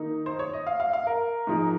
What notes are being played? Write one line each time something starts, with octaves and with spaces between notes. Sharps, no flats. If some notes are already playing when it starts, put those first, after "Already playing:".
Already playing: D#3 A#3 D#4
C5
C#5
D#5
F5
F5
F5
A#4
G#2 F3 G#3 D#4